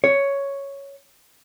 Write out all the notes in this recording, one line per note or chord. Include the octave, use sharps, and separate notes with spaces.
C#5